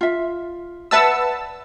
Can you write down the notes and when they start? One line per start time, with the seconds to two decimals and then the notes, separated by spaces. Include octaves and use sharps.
0.01 F4 E5
0.91 B4 D5 E5 F#5 A5 E6